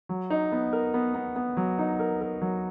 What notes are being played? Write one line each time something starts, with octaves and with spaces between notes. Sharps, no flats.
F#3
D#4
B3
A#4
B3
B3
B3
F#3
D#4
A#4
A#4
F#3